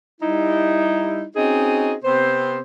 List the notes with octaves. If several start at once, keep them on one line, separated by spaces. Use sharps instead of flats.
G3 D#4 E4
C4 C#4 D#4 F#4 G#4 D#5
C3 B3 C4 C5